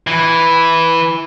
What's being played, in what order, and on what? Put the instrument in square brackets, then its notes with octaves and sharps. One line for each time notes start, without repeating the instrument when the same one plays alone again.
[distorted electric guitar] E3